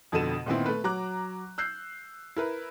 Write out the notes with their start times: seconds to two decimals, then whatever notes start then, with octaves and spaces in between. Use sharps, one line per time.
0.12 F2 B2 D3 A4 D#7 E7
0.46 A#2 D#3 B3 C4 E4
0.66 A3 B4
0.84 F#3 A#5 D6 F#6
1.58 E6 F#6 G6 C7
2.36 E4 A#4 B4